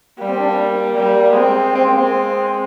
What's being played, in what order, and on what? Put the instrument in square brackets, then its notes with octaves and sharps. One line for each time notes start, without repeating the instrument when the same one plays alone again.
[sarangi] G3 [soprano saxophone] A#3
[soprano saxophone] C4
D4
A#3
[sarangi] G3
[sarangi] G#3 [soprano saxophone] C4
[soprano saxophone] C4
A#3
C4